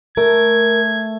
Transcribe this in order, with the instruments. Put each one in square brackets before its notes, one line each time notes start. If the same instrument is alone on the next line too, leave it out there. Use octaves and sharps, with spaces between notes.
[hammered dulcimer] A3 [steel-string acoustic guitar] A#4 [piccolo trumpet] G#6